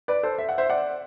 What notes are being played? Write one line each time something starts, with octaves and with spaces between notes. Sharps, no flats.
B4 D5
A4 C5
E5
F#5
C5 E5
D5 F#5